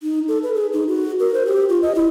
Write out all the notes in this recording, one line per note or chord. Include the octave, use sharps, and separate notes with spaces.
D#4
A4
B4
G#4
D#4
F#4
A#4
C5
G4
F4
D#5
E4